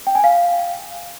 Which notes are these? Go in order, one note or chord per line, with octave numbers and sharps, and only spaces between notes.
G5
G#5
F5